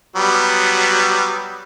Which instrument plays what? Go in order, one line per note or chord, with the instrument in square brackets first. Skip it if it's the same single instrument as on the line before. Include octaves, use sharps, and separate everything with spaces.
[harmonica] F#3 G3 B3